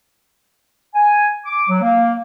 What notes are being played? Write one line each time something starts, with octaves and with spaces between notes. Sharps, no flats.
G#5
D6
F#3
A#3